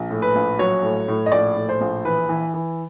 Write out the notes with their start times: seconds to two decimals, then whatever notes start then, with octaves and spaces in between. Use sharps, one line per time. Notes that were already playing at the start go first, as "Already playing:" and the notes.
Already playing: A#1
0.11 A2
0.22 B4
0.35 A#1
0.59 F#3 C#5
0.83 A2
1.08 A2
1.26 D#5
1.32 A#1 D5
1.57 A2
1.69 C5
1.81 A#1
2.05 E3 B4
2.29 E3
2.54 E3